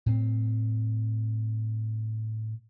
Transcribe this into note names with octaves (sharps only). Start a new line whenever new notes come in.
A2 C4